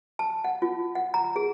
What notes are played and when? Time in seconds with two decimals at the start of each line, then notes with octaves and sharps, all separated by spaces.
0.19 A5
0.44 F#5
0.62 F4
0.95 F#5
1.14 A#5
1.36 G#4